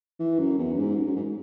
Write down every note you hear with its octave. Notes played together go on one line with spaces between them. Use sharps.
E3
F#2
E2
F#2
G#2
F#2
F#2
G#2